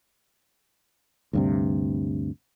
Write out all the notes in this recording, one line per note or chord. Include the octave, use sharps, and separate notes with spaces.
D2 G2 C3